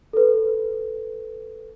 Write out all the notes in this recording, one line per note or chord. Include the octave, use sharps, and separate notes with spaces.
A4 B4